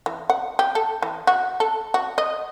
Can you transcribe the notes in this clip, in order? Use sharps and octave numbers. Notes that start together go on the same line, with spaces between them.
E3
F#5
G4
A4
E3
F#4
A4
F#4
D#5